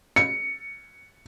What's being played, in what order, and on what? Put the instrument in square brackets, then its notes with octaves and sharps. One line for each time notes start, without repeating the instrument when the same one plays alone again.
[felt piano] C#7